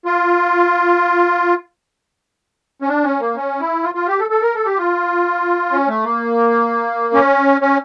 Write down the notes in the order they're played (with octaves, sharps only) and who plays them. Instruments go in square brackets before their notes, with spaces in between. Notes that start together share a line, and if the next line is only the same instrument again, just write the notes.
[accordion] F4
C#4
D4
C#4
A#3
C#4
E4
F4
F4
G4
A4
A4
A#4
A4
G4
F4
C#4
A3
A#3
C#4
C#4